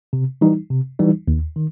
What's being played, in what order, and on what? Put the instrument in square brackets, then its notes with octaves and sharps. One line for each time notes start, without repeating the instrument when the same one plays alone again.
[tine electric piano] C3
E3 G3 D#4
C3
E3 G3 D#4
D#2
D#3